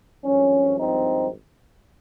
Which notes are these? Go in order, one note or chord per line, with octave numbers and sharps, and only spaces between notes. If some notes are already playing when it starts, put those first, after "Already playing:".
G#1 G2 F3 C#4
C4 D#4